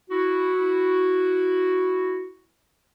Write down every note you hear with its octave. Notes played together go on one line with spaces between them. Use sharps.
E4 F#4